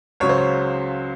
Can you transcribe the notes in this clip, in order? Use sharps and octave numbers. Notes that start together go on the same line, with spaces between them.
C#2 C#3 F#3 C#5
C5
C#5